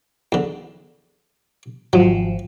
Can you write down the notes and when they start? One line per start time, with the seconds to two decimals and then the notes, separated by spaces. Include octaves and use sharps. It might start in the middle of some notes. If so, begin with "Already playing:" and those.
0.32 E2 D3
1.93 G#1 F3 F#3